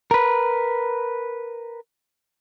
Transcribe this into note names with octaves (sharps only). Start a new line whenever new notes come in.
A#4 B4